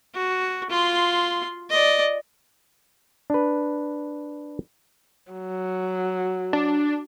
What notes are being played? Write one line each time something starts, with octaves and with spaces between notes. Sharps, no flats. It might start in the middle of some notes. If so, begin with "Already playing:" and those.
F#4
F4 C6
D5 D#5
D4 B4
F#3
D4